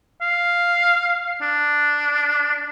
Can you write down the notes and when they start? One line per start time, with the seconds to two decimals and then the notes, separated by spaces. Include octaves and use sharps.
0.22 F5
1.42 D4